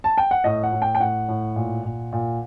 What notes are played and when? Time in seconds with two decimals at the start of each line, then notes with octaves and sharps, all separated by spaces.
0.04 A5
0.18 G5
0.31 F#5
0.44 A2 D#5
0.63 F#5
0.72 A2
0.82 G5
0.95 G5
1.00 A2 F#5
1.28 A2
1.56 A#2
1.84 A#2
2.13 A#2